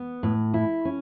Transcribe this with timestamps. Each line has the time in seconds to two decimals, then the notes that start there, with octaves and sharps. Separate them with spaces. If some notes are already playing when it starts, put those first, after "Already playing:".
Already playing: B3
0.23 A2
0.54 E4
0.85 C#4